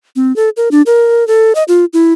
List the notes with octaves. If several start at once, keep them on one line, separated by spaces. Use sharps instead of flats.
C4
A4
A#4
D4
A#4
A4
D#5
F4
E4